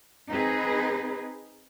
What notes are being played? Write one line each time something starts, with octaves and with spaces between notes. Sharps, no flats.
C4 D#4 G#4 B4